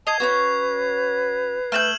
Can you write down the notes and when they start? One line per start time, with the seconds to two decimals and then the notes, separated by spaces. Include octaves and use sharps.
0.07 D#5 A5 G#6 C7 F7
0.20 C#4 D#4 F#4 B4
1.72 A3 A5 F6 G6 E7 F#7